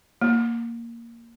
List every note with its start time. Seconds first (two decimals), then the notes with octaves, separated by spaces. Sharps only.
0.21 A#3